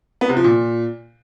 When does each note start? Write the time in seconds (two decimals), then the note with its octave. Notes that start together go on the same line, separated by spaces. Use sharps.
0.21 B3
0.29 C3
0.37 F3
0.44 A#2